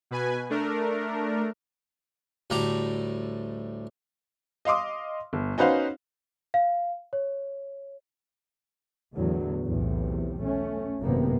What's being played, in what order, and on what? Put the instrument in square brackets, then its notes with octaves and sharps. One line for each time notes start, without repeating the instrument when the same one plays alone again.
[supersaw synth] B2 B4 G#5
A3 D4 A#4
[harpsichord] D2 A2 G3 A#5 D6
[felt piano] D#5 F5 C6 D6 D#6
G1
C#4 D#4 F#4 B4 C5 F5
[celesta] F5
C#5
[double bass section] E2 A2 D3 F#3
B1 E2 A2 C3
A3 C#4
G#1 F#2 C3 A#3 B3